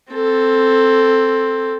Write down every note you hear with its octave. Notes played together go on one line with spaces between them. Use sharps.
C4 A4